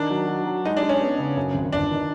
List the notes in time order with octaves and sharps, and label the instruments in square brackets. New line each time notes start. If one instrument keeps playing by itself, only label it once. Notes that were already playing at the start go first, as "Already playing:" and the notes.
Already playing: [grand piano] D#3 [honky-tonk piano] D4
[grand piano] F#3
F#3
F#3
[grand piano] G#3 [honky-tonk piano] D#4
[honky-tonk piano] D4
[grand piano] G#3
[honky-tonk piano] C#4
[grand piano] B3
C#3
F#2
G#1
[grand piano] G1 [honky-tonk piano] D4
[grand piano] D#3